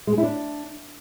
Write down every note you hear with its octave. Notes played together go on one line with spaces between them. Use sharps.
G#3
G#4
E4
D4